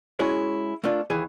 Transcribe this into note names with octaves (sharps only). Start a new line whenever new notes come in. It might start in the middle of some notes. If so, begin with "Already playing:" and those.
G#3 C#4 E4 F#4 G#4 C#5
A3 A#3 D4 F4
D#2 E3 G#4